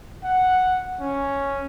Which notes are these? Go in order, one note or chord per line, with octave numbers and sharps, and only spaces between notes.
F#5
C#4